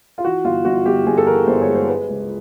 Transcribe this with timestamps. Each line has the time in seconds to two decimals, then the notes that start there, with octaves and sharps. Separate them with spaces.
0.18 F4
0.24 E3 F#4
0.44 G1 F4
0.65 G1 F#4
0.85 G1 G4
1.06 G1 G#4
1.17 A4
1.27 E3 A#4
1.47 G1 C5
1.62 C#5
1.68 G#3
1.75 C5
1.88 G#3 B4
2.09 C#2